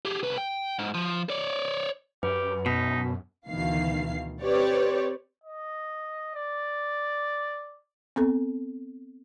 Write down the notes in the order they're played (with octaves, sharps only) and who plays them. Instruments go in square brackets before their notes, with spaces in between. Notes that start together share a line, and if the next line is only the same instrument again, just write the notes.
[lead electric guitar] G4 G#4
C2 B4
G5
G#2
F3
C#5 D5
[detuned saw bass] F#2 [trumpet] G4 [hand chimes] B4
[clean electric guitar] B2 [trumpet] D#4 [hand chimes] B6
[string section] D2 B2 D#3 E3 F5 C7
C4 G4 B4 C#5 D5
[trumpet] D#5
D5
[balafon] B3 C4 A4